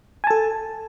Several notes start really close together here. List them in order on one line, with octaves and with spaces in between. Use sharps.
G#5 A5 A4